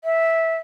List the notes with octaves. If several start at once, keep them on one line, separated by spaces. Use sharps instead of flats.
E5